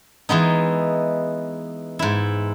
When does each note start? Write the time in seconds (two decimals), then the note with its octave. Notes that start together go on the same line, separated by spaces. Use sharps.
0.29 E3 G#3 B3 D#4
1.99 G#2 E4